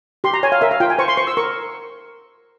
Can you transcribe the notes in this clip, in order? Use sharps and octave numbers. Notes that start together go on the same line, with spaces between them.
G4 C6
A#5
C#5 G#5
F5
A#4 E5
F5
F4 G5
G#5
C5 C#6
C6
C5 C#6
E6
A#4 C#6